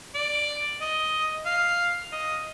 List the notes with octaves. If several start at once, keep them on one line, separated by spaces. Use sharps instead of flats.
D5
D#5
F5
D#5